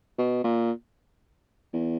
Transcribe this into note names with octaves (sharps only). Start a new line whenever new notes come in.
B2
A#2
E2